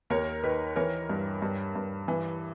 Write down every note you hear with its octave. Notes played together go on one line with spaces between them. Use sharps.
D#2 A#4 C#5
D#3 B4
E3 A#4 C#5
G2
G2
G2
E3